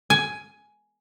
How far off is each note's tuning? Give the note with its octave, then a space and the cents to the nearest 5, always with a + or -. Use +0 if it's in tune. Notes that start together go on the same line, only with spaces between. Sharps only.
G#5 +10